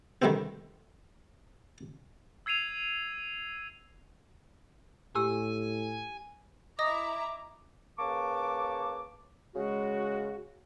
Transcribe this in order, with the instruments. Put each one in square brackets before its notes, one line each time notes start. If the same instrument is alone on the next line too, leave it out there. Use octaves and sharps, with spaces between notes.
[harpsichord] D3 D#3 G3 A3 B3 C4
[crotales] E6 G#6 C7 D#7 F7
[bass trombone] A2 [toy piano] G4 E6 [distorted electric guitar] G#5
[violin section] E4 E5 A#5 [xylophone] D#5 D#6 A#6 [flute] D6
[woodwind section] C#3 A#3 B4 A5 C#6 D6
C#3 G#3 F#4